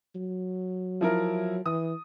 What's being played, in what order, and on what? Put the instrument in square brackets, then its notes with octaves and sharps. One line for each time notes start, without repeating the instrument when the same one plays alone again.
[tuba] F#3
[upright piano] F3 E4 A#4
[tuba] E3 [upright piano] D#6